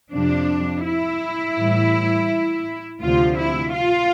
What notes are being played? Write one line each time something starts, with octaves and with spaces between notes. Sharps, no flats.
F2 C3 F3 D4
E4
A2 E3 G3
D2 C3 F3 F4
E4
F4